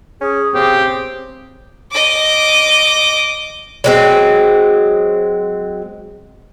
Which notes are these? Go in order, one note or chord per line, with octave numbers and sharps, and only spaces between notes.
C#4 G#4
C#3 C4 G4
D#5 D6
F#3 G#3 C4